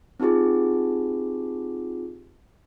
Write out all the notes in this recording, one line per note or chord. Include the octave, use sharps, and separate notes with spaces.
C4 D#4 F4 G4 G#4